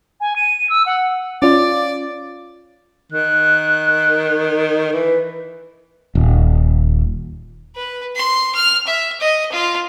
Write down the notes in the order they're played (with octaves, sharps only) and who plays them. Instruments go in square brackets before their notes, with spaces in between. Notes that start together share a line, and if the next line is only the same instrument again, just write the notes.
[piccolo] G#5
D#7
E6
F#5
[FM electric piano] C#4 F4 [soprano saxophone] D5
[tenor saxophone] D#3 [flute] F#6
[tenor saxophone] E3 [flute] B4
[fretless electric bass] D#1
[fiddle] B4
C6
F6
E5
D#5
F4